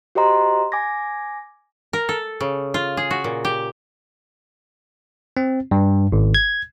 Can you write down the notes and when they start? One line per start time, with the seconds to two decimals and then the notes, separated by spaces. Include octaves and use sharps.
0.15 F#4 G4 C5 D#5 A#5 C6
0.72 G#5 D6 G#6 A#6
1.93 A#4
2.09 A4
2.41 C#3
2.74 F4
2.97 G#4
3.11 F#4
3.24 A#2
3.45 G4
5.37 C4
5.71 G2
6.12 G#1
6.35 G#6